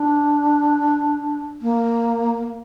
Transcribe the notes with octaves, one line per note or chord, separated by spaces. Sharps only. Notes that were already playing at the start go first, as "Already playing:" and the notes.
Already playing: D4
A#3